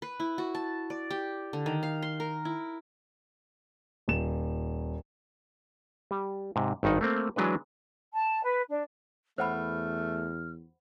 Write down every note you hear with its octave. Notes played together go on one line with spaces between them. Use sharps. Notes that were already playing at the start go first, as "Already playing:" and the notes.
B4
E4
F#4
A5
D5
G4
D3
D#3
F5
C6
A#4
E4
D#1 E7
G3
G#2 C3
G#1 G2 D#3 D#4 F#5
A3 A#3 C4
E3 F#3 G#3 D4 B4
A5
B4
D4
E2 A3 C5 F#5 B5 F6